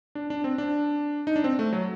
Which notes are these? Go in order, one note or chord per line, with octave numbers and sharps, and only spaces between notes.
D4
D4
C4
D4
D#4
D4
C4
A3
F#3